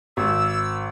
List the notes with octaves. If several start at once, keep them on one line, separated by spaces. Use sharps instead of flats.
G#1 E6